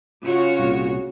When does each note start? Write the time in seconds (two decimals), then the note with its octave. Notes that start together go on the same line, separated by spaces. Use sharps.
0.23 C#3 F4 F#4 C#5
0.59 C2 A#2